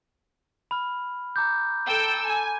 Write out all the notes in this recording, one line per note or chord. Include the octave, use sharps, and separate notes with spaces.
B5 F6
A#5 D6 G6
A4 G5 E6
G#5